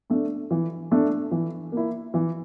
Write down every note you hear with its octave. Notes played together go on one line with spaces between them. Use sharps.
A3 D4
E3
A3 D4
E3
A#3 E4
E3